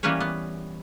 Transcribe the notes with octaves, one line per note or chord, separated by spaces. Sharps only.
E3 G3 A#3 C#4 B4 C#5
B3